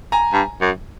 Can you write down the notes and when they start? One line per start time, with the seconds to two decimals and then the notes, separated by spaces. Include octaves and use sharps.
0.12 G#5 A#5
0.33 G2
0.61 F#2